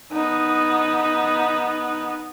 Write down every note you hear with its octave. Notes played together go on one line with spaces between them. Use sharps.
B3 D#4